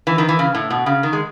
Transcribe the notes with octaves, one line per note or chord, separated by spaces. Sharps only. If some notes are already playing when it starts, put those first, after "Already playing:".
E3
D#3
E3
C#3
A2
B2
C#3
D#3
G#3